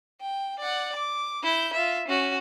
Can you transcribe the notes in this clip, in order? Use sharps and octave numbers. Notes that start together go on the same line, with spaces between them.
G5
D5 F#5
D6
E4 G6
F4 E5
C#4 F#4